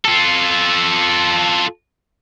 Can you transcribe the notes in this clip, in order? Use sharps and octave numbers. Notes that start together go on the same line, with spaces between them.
F4 A4